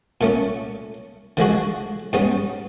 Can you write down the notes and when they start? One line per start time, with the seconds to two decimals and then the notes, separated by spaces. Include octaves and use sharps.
0.21 A#2 A3 C#4
1.37 D3 F3 G#3 F#4
2.13 G#2 G3 B3 C#4